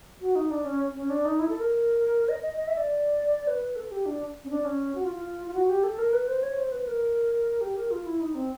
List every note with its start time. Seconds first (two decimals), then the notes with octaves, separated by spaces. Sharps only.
0.21 F#4
0.35 D#4
0.51 D4
0.65 C#4
0.94 C#4
1.10 D4
1.25 D#4
1.40 E4
1.49 A4
1.59 A#4
2.29 D#5
2.43 D#5
2.58 D#5
2.67 E5
2.77 D5
3.47 B4
3.76 A4
3.91 G4
4.06 D4
4.44 C#4
4.50 D4
4.65 C#4
4.95 F#4
5.04 F4
5.15 F4
5.47 F4
5.54 F#4
5.69 G4
5.84 A4
5.98 A#4
6.13 B4
6.28 C5
6.43 C#5
6.58 C5
6.72 B4
6.87 A#4
7.61 G4
7.76 A#4
7.91 F4
8.06 E4
8.21 D#4
8.35 C4